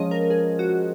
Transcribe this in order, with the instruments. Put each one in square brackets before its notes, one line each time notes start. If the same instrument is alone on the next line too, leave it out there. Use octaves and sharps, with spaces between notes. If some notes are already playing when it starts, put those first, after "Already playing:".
Already playing: [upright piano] F3 G#3 C#4 F4 [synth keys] D#5
[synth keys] A#4
G#4
F#4